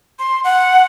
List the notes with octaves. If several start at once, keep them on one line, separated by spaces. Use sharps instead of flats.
C6
F#5